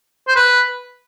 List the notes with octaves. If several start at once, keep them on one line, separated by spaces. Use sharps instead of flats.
C5
B4